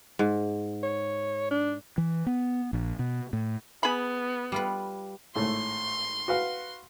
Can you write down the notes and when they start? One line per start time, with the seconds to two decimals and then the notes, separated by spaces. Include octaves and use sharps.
0.19 G#2
0.83 C#5
1.51 D4
1.98 E3
2.26 B3
2.73 A#1
2.99 B2
3.33 A2
3.83 B3 G#4 B5
4.52 G3 F4 B4
5.35 G#1 A2 A3 C6
6.28 F#4 B4 F5